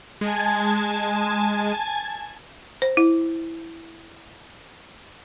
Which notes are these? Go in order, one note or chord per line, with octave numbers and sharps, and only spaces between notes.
G#3 G#5 A5 G#6
C5
E4